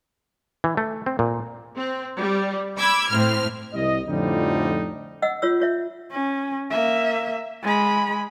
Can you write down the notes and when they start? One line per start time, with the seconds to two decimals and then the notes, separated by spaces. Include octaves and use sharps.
0.64 E3
0.77 A3
1.06 C4
1.19 A#2
1.77 C4
2.18 G3
2.78 B5 D6 E6 G#6
3.09 A2 C4 F6
3.74 C2 D#5
4.07 F2 A2 D3 F3 G3 D#4
5.22 D#5 F#5 E6
5.42 F4 C#5 E6
5.60 F4 C#5 E5
6.11 C#4
6.71 A#3 E5
7.63 G#3 B5